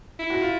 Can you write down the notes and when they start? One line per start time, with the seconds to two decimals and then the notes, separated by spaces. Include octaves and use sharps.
0.19 E4
0.30 F#4
0.41 F4